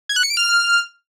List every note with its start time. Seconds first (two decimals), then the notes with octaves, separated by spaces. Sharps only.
0.09 G#6
0.16 F#6
0.23 C#7
0.30 D7
0.37 F6